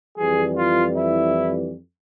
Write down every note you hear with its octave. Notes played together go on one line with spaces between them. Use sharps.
F2 E3 G3 G#4
F4
E4